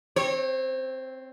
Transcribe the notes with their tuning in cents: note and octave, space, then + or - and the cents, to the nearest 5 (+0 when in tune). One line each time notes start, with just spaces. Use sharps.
C4 +0 C#5 -35